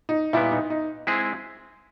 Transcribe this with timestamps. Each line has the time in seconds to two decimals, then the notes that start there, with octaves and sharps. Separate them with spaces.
0.09 D#4
0.33 A#2 G3 B3 E4
0.51 D#4
0.70 D#4
1.07 G#3 C4 E4 G#4